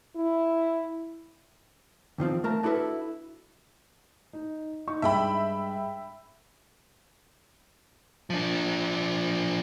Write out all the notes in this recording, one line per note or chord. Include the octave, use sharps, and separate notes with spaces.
E4
E2 D#3 F3 C4
A3 A#4 A5 A#5
D4 E4 F#4 A4 B4
D#4
D#4 C#6
G2 G#3 E5 G5 B5
F3 D4